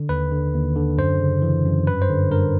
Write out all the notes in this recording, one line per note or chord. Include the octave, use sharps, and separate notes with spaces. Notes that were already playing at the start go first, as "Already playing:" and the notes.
Already playing: D3
D#2 B4
D3
D#2
D3
F#2 C5
C#3
E3
F#2
G2 B4
C5
D3
G2 A#4